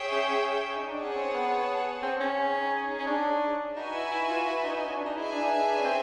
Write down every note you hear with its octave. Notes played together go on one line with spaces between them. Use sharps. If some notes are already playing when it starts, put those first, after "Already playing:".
Already playing: G#4 C#5 E5 G5
C#4
C#4
D#4
D4
C#4 G#4 C#5 F#5 A5
C4
B3
C4
C#4
D#4 G#4 C#5
C#4
D4
D#4 F#4 B4 E5 G#5
E4
E4
F4
E4
D#4
C#4
D4
D#4
E4 G#4 B4 E5 G#5
D4
D#4
D4
C#4
C4